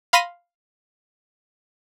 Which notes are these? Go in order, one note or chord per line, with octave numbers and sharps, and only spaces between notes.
F5 B5 C6 A#6 B6 D#7